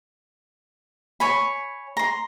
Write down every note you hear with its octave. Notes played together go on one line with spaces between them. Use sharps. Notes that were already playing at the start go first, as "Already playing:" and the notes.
C#5 G#5 B5
A#5 C6